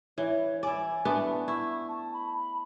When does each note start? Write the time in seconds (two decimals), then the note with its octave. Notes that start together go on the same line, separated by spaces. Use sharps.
0.18 E3 C#5
0.63 E4 D5 G#5
1.05 A3 B3 D4
1.48 E4 C#6
1.89 A5
2.14 B5